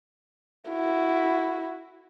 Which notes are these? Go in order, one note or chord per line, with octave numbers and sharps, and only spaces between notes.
E4 F#4